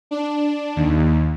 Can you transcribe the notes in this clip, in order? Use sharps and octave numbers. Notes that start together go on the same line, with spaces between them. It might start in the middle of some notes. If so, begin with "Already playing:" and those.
D4
D#2